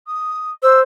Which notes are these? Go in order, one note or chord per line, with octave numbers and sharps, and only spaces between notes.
D#6
C5 E6